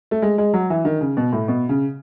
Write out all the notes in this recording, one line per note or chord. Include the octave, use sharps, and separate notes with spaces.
A3
G#3
G#3
F#3
E3
D#3
C#3
B2
A2
B2
C#3